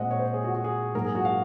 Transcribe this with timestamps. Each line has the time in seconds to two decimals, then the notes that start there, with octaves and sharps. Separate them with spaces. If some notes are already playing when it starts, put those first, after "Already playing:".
Already playing: A#2 G#3 C4 D#5 F#5
0.11 C#5
0.19 C5
0.34 G#4
0.44 F#4
0.55 F#4
0.64 G#4
0.95 G#2 F#3 A#3 A#4
1.05 G#4
1.15 F#4
1.25 F5